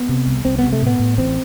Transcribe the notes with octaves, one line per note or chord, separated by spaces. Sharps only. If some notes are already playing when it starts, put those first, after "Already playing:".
Already playing: B3
C3
C2
C2 C4
C3 B3
A3
A2 B3
A2
A1 C4